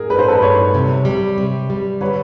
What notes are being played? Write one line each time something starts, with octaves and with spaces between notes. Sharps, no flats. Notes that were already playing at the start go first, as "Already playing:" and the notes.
Already playing: G#4 A#4
G2 B4
C5
A4 B4
G2 B4 C#5
C3
G3
C3
G3
D3 B4 C#5